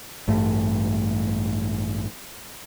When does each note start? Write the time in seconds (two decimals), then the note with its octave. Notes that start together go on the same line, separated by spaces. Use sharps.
0.28 A1 G2 A3